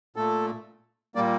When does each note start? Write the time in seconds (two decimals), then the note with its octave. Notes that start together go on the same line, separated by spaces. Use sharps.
0.16 A#2 A3 A4
1.15 A#2 G3 A#3 D5